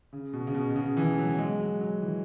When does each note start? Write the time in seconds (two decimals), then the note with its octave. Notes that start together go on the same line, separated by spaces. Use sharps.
0.13 C#3
0.33 B2
0.47 C#3
0.54 B2
0.70 B2
0.76 C#3
0.97 E3
1.17 F#3
1.29 F#3
1.38 G#3
1.60 F#3
1.81 F#3
2.02 E3